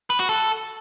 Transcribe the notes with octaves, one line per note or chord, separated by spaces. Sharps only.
B4
F#4
A4